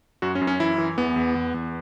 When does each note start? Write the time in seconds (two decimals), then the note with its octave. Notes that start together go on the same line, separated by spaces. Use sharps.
0.22 F#2 F#4
0.35 C#4
0.41 F#2
0.47 C#4
0.60 E3 E4
0.78 E3
0.98 E2 B3
1.16 E2
1.35 E2
1.54 E2